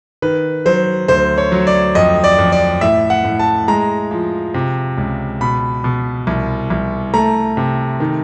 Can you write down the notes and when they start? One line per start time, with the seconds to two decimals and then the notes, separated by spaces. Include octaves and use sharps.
0.22 D#3 B4
0.66 F#3 C5
1.08 D2 C5
1.38 C#5
1.52 F#3
1.67 D5
1.95 F2 D#5
2.24 D5
2.38 F2
2.52 D5
2.81 A2 E5
3.10 F#5
3.25 A2
3.39 A5
3.68 G#3 A#5
4.11 F3
4.54 C3
4.98 C#2
5.41 B2 B5
5.84 B2
6.27 C2
6.70 C2
7.14 A3 A#5
7.57 C3
8.00 D#3